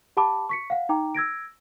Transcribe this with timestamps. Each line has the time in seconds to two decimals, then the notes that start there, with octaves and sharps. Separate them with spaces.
0.17 G4 F#5 A5 B5 D6
0.49 C#6 B6 C#7
0.70 F5 F#5
0.89 D#4 G5 A#5 D6
1.15 E6 G#6 A#6 D7